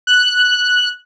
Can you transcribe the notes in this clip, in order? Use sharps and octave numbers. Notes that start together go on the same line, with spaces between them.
F#6